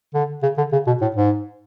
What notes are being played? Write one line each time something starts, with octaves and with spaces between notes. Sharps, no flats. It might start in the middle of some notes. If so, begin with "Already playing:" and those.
D3
C#3
D3
C#3
B2
A2
G#2